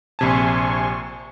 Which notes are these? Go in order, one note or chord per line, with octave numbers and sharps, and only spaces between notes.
A#1 C3 G#5 A5 C6 C#6